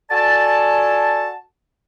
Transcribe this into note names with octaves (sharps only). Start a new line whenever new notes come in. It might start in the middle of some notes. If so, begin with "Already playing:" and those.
F#4 A4 D5 G#5 A5